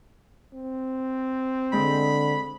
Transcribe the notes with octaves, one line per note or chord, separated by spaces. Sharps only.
C4
D3 G#3 B5